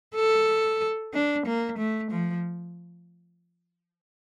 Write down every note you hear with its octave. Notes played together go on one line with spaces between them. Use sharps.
A4
D4
A#3
A3
F3